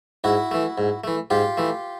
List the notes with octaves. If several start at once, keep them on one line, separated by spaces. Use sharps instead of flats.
G#2 E4 F#4
E3 A3
G#2
E3 A3
G#2 F4 G4
E3 A3